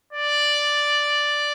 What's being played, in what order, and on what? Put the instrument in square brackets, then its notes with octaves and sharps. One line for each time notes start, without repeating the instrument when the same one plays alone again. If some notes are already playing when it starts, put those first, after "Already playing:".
[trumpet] D5